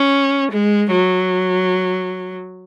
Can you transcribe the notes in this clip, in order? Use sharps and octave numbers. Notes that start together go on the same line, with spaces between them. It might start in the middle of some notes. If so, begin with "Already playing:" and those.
Already playing: C#4
G#3
F#3